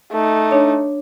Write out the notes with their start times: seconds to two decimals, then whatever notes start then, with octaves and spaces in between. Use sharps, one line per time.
0.12 A3 D#4
0.51 D4 C#5